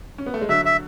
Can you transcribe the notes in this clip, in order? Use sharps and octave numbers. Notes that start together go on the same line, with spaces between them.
C#4
B3
A3
G#3
D3 F#3 E5
E5